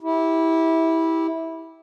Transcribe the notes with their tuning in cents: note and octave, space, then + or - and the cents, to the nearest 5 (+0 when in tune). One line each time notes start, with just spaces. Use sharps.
E4 -15 G4 +0